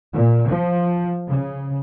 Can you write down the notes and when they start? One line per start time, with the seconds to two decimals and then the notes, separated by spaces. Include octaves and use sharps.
0.13 A#2
0.49 F3
1.30 C#3